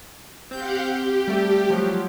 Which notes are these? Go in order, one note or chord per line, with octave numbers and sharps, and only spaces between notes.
C4 G4 F5 F#5 G6
G4
G3 A3
F3 F#3